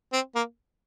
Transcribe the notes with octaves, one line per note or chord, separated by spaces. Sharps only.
C4
A#3